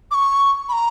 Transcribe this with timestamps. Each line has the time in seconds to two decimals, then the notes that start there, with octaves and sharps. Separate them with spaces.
0.11 D6
0.14 C#6
0.69 B5
0.72 A#5